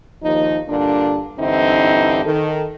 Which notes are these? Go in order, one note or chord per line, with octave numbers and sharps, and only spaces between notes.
D#2 F3 D#4
G2 A#2 D3 D4
G2 D3 E3 C4 D#4 E4
D#3 A4